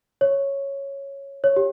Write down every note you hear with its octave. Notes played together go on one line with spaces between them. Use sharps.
C#5
C#5
G4